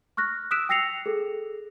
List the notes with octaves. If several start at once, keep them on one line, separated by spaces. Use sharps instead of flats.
C#6 F6 F#6 A#6
D#6 E6 F#6 B6 D7 E7
G5 E6 A#6 C7 C#7 F7
G#4 A4